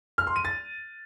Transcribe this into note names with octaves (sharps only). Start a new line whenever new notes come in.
F6
C6
D#7
A6